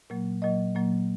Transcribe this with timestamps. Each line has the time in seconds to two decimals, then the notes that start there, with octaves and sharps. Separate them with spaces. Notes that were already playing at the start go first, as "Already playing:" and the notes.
0.10 A#2 F#3 A#3
0.42 A#2 F#3 A#3 D#5
0.76 A#2 F#3 A#3